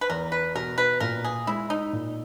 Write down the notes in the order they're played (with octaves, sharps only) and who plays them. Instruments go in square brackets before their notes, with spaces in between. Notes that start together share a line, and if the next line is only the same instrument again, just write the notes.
[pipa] B4
[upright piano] E2 [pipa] A#4
[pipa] B4
[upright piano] B2 [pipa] A#4
[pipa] B4
[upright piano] A#2 [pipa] A#4
[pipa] G#4
[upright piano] G#3 [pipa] E4
[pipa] D#4
[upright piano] A#2